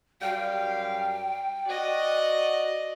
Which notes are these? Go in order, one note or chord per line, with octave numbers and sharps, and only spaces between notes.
F#2 G3 F5 G5
F#4 D5 D#5